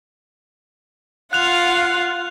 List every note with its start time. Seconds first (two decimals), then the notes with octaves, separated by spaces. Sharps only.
1.33 F4 F5 F#5 F#6 F7